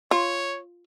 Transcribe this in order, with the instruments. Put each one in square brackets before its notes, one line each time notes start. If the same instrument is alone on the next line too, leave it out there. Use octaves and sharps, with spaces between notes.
[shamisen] F4 [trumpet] C#5